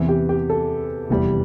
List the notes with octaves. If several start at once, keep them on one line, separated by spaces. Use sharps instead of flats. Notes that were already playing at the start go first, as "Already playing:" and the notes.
Already playing: E2 C3 E3
G4
G4
A4
F1 E2 E3 G3